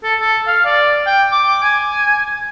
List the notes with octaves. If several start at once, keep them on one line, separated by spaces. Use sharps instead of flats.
A4
A4
F5
D5
G5
D6
G#5